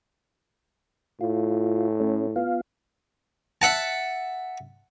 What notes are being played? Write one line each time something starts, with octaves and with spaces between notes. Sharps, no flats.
A2 F4
A3 C#4
B3 F4 F5
E5 F#5 A5